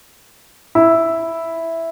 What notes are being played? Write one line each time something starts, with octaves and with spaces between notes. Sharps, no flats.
E4